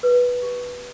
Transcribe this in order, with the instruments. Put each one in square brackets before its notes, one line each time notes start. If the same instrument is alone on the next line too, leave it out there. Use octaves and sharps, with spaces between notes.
[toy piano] B4
G4